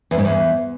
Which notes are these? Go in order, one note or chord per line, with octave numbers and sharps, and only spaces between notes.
E2
G#2
E2